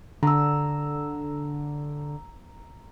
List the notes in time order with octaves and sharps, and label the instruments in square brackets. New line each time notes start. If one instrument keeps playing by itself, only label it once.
[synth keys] D3 [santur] A#5 E6